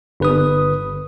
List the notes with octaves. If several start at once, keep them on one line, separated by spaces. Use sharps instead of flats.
G1 B4 D#6